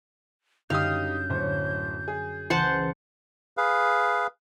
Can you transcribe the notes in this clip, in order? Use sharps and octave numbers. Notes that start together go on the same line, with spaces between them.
F#2 D3 G3 D#4 G4 F5 D#6 G6
D1 C5 C#5 B5
G#4
C#2 E3 C5 F#5 A5
G#4 B4 F5